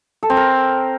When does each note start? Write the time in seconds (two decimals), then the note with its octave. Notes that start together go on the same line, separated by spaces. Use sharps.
0.23 A4
0.30 C4
0.37 A#4